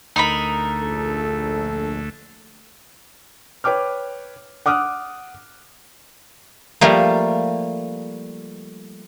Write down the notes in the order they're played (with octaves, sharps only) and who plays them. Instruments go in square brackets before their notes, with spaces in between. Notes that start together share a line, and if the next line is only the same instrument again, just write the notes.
[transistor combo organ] D2 A3 [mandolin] D#4 A#4 B5
[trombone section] A#1 A4
[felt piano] B4 C#5 G5 D6 F6
F#5 D6 D#6 F6 F#6
[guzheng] F3 G3 A3 A#3